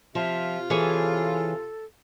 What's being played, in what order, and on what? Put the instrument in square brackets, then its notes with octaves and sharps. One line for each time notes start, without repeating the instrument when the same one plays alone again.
[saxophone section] C3 F4 [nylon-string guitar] F3 [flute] E5
[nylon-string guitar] E3 G#4 C#5 [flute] A4